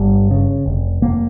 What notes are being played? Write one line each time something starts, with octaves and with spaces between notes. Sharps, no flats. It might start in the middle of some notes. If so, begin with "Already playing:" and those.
Already playing: G1 G3
C#3
F1
F1 A#3